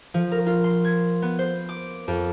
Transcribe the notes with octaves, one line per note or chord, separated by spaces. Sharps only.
F3
A#4
F4
C6
G#6
B3
C5
D6
F2